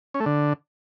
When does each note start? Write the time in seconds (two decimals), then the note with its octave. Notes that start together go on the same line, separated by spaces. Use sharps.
0.14 C#4
0.20 A3
0.26 D3